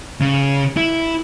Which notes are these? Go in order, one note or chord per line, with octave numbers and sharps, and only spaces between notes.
C#3
E4